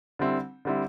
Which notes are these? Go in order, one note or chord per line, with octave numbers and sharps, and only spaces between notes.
D3 G3 C4 E4
D3 G3 C4 E4